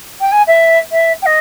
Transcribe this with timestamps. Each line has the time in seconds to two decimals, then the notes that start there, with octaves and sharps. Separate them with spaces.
0.21 G5
0.32 G#5
0.47 E5
0.91 E5
1.22 G5
1.26 D#5